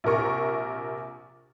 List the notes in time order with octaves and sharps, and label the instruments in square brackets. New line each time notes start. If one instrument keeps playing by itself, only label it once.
[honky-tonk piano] A#1 C3 A#4 C#6